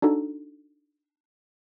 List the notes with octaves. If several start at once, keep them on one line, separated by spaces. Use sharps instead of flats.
D4 D#4 F#4 A4